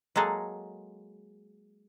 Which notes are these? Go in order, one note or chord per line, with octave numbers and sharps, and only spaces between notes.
F#3 G#3 A#3 G#4 A4